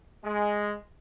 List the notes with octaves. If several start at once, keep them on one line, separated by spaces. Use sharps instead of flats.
G#3